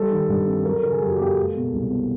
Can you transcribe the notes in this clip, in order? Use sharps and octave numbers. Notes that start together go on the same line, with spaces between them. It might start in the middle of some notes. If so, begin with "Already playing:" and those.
Already playing: G3 A4
D#3
G2
C4
F#3 A#4
A4
C#3 A#4
G#4
F#2 G4
F#4
A#3 G4
A4
G#3
B2
C2
B3